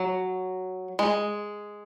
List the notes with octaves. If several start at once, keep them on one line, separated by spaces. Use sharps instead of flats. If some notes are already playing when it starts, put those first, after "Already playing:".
Already playing: F#3
G#3